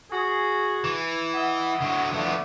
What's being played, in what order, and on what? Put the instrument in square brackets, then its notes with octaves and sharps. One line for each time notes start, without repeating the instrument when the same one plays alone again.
[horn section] F#4 G#4
[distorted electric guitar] E3
[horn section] D#5 E5 F#5
[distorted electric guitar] D3 F#3
[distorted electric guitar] F2 B3 [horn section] D3 A3